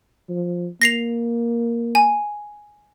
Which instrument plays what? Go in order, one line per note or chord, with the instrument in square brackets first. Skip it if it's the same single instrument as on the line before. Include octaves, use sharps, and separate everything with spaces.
[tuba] F3
[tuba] A#3 [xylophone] A#6 C7 F7
[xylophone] G#5